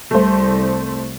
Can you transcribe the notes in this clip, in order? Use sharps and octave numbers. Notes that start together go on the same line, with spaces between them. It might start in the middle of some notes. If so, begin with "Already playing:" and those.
C2 A3 C5